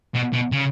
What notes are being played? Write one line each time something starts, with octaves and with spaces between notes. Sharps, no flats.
B2
B2
C#3